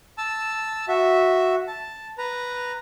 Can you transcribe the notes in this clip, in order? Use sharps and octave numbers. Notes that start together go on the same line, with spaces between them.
A5 E6
F#4 E5
A5
B4 A#5